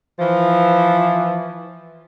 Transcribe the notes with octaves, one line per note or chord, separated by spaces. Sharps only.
E3 F3